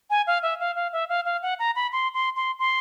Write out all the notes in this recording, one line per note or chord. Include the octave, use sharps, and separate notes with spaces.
G#5
F5
E5
F5
F5
E5
F5
F5
F#5
A#5
B5
C6
C6
C6
C6